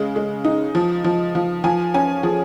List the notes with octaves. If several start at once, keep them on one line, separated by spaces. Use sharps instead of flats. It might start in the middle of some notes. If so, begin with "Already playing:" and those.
Already playing: C#3 G#3
G#3
D#4
F3
F3
F3
F3 G#5
C#4 G#5
F3 G#4